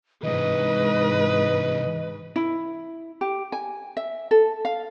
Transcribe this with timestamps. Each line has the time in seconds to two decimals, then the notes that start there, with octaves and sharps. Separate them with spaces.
0.24 G#2 C3 E3 B4 D#5
2.36 E4
3.21 G4
3.52 G#5
3.97 E5
4.31 A4
4.65 F5